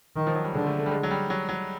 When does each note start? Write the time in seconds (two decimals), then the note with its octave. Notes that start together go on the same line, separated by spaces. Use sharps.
0.16 D#3
0.27 F3
0.35 F#3
0.44 G3
0.54 D3 G#3
0.66 A3
0.79 A3
0.86 G3
0.91 G#3
1.03 F#3
1.11 G3
1.30 F#3
1.49 F#3